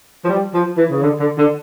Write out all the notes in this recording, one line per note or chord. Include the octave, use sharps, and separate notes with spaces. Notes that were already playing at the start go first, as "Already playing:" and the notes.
F3
G3
F3
E3
C#3
D3
D3
D3